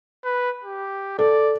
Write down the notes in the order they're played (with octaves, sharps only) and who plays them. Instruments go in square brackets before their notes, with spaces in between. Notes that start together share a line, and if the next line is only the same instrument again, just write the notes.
[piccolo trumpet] B4
G4
[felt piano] A4 [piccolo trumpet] D5